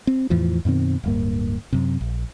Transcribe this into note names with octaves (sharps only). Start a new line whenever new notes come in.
C4
E2 A2 E3 F3
F#2 B2 D#3 C4
D1 G2 A#3
F#2 C3
A#1